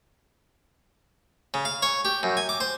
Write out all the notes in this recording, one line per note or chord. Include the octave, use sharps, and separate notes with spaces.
C#3
F5
C#5
G4
F#2
G#5
D6
C5